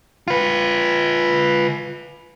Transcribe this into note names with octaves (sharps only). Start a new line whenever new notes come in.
F4 B4